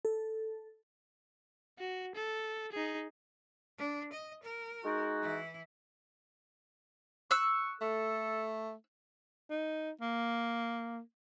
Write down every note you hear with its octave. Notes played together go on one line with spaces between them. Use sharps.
A4
F#4
A4
D#4 G#4
D4
D#5
A#4
G#3 D#4 F#4
E3 E4
C#6 E6 F#6
A3 A4
D#4
A#3